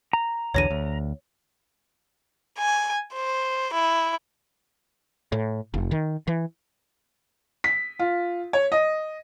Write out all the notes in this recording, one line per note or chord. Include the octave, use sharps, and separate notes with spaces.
A#5
B1 E2 D3 C#5 A#6 D#7
D2
G#5
C5
E4
A2
F1
D#3
E3
B6
F4
C#5
D#5